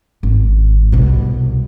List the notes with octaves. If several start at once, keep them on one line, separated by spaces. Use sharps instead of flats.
G#1
C2 B2